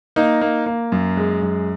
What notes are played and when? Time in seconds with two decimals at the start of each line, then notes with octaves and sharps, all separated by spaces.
0.16 A#3 D#4
0.41 A#3
0.66 A#3
0.92 F#2
1.17 G#3
1.42 F#2